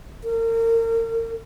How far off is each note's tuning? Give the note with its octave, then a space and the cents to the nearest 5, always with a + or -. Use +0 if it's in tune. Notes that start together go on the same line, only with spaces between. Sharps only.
A#4 -35